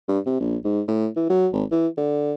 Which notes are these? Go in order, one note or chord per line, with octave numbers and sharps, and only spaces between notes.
G2
C3
A#1
G#2
A2
E3
F#3
G#1
E3
D3